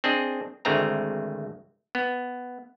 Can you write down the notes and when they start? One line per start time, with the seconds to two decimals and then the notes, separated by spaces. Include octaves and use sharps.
0.04 C4 D4 G#4 D#5
0.65 G#1 D2 G#3 A3 C4 A#5
1.95 B3